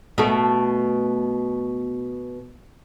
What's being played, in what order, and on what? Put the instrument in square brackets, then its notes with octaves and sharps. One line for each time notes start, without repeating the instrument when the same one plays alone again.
[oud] B2 A3